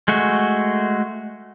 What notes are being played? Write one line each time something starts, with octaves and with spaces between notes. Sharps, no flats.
G#3 A3 F#4